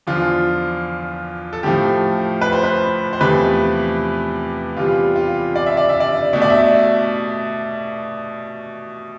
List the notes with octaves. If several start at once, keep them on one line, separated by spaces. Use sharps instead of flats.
E2 D3 F3 F4
A4
A2 F3 A3 G4
B4
C5
B4
C5
E2 C3 F3 A3 B4
E2 C3 G3 F4
F4
D5
E5
D5
E5
D5
B2 A3 E5
D5
E5